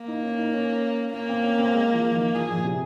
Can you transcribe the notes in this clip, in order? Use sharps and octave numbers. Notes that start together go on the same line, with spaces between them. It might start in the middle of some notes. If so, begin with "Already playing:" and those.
Already playing: A#3
D#4
C#4
D#4
C#4
A#3 C#4
C4
C#4
C4
G#3
F3
D#3
F3 G#4
A#2
C3